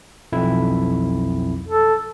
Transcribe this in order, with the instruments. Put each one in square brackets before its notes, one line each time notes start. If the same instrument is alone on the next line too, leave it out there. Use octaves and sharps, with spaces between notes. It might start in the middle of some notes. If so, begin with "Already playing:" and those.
[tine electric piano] B1 F2 E4
[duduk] A4